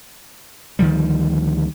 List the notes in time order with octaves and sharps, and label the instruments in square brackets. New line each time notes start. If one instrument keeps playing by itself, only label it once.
[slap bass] D2 D#3 F3 G3